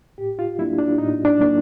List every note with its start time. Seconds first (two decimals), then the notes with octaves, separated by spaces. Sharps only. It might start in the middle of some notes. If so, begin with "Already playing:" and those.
0.18 A2 G4
0.39 F4
0.58 F#3 A#3 D4 E4
0.78 D4
0.98 A2 D#4
1.25 D4
1.39 F#3 A#3 D4